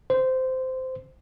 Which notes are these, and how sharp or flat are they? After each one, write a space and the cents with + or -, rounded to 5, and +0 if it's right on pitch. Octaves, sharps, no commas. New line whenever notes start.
C5 -15